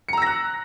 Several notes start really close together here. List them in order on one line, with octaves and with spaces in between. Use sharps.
C#7 A#5 E6 A#6 F#6